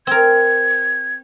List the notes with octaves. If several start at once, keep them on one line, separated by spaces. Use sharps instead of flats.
C4 A#4 G#6